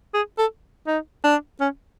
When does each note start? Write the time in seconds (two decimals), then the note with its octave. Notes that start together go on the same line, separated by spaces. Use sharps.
0.14 G#4
0.39 A4
0.87 D#4
1.25 D4
1.61 C#4